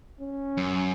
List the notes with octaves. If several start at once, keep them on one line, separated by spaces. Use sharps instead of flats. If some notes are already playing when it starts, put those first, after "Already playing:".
C#4
F#2